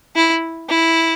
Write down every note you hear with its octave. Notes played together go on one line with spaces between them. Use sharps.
E4
E4